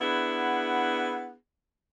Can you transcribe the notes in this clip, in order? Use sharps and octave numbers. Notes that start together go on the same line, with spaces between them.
B3 D4 E4 G#4 F#5